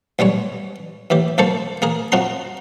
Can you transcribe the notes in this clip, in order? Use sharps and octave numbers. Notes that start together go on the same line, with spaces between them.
B1 G3 G#3 C#5
D#2 E3 G4
B1 A#3 A4 C5 C#6
A#3 G#4 A#4
F2 F3 C4 F#4 A#5 C6